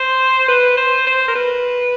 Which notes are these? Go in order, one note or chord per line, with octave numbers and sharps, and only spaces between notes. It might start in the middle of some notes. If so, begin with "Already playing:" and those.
Already playing: C5
B4
C5
C5
A#4
B4